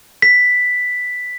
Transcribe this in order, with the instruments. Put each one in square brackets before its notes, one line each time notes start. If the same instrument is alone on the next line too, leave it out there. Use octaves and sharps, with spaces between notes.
[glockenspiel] B6